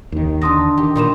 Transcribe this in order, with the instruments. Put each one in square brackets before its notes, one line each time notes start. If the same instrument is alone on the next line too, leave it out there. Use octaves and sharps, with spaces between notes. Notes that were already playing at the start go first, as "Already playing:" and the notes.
[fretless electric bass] D#2 D#3
[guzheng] D3 D#4 A4 [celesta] C6 D#6 A#6
[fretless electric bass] D#3 [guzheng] G4
[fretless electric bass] A#2 [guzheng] G3 D#4 A#5 [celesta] A#4 C6 E7